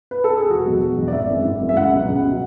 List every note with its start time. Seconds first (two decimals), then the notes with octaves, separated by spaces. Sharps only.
0.11 B4
0.24 A4
0.37 G#4
0.49 E1 F#4
0.66 E2 B2 F#3
0.81 E1
0.97 E2 B2 F#3
1.08 D5
1.13 G#1 E5
1.29 F#2 E3 G#3
1.45 G#1
1.61 F#2 E3 G#3
1.69 E5
1.77 C#2 F#5
1.93 B2 F#3
2.08 C#2
2.24 B2 F#3